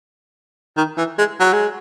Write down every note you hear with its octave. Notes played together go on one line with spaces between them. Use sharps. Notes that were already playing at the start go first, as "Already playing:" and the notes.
D#3
E3
G#3
F#3
G#3